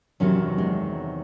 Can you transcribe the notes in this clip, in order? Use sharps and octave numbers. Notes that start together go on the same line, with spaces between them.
E2 C3 D#3 F#3 C#4
G#3